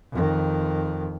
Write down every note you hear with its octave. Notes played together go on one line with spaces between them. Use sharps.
F2 D#3